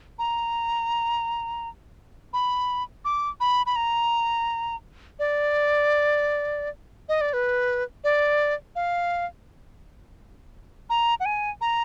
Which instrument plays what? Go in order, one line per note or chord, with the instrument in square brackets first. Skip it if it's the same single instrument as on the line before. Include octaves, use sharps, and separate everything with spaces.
[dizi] A#5
B5
D6
B5
B5
A#5
D5
D#5
D5
B4
D5
F5
A#5
F#5
G#5
A#5